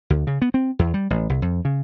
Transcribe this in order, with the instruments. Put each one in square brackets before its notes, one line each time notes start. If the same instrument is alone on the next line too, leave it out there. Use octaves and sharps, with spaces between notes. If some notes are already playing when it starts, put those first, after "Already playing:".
[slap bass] D2
C#3
B3
C4
E2
G3
A1
C2
F2
C#3